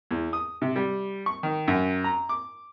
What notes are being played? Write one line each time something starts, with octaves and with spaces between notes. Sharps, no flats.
E2
D#6
C3
G3
C#6
D#3
F#2
A#5
D6